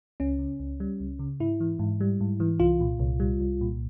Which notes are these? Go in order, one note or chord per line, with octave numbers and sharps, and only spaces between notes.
C#2 C#4
C#3
C#2
G3
C#2
C#3
G#2 E4
E3
G#2
G3
G#2
E3
C2 F4
A#2
C2
G3
C2
A#2